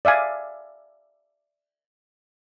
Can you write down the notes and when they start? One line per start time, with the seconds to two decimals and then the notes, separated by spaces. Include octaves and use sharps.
0.05 D5 E5 F5 G#5